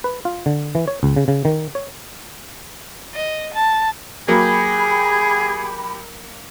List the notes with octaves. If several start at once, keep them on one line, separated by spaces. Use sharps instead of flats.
B4
F4
D3
E3
C#5
C#2
C#3
C#3
D#3
C#5
D#5
A5
F#3 A#3 G4 G#4 B5